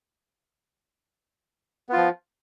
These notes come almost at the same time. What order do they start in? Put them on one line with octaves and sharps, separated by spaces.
B3 F4 F3